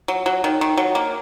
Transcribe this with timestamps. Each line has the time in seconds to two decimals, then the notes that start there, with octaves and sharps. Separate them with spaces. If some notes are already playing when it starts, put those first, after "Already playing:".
0.08 F#3
0.26 F#3
0.44 D#3
0.61 D#3
0.77 F#3
0.95 A#3